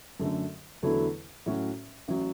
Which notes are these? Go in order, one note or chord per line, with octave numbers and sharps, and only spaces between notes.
F#2 D3 A3
E2 D3 F#3 A3 E4
A2 F#3 C#4 F#4
A1 F#3